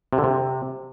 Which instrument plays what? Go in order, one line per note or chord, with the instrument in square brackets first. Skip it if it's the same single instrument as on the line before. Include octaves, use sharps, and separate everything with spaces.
[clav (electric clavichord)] C3
D3
C3